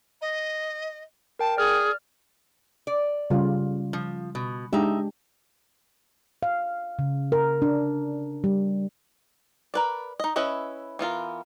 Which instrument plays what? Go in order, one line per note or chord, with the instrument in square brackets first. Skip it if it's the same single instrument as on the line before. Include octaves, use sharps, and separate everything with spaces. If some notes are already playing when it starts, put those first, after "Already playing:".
[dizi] D#5
[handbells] A#4 G5 [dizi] A5
[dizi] G#4 [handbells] D5 F6
[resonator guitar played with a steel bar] D5
[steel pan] C#3 G3 F4
[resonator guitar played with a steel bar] F3
B2
[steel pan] G#3 D4 G4 [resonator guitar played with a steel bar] D#4 E5
[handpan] F5
C#3
A#4
D4
G3
[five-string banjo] A#4 B4 D5
D#4 D#5
C#4 E4 B4 D#5 E5
E3 B3 F4 A#4